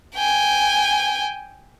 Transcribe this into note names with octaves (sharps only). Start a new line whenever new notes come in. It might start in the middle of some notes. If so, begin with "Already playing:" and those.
G5 G#5